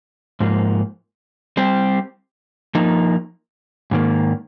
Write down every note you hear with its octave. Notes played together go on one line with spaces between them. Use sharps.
G#2 F3 A#3
G3 C4 G4
F3 A#3 D#4
G#2 D#3 A#3